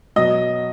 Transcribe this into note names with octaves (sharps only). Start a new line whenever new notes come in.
B2 F#3 D#5